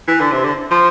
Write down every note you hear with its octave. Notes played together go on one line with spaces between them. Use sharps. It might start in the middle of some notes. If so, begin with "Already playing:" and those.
E3
D3
C3
D3
F3